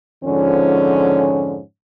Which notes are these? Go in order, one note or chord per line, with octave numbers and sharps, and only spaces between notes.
F2 G#2 D3 F3 C#4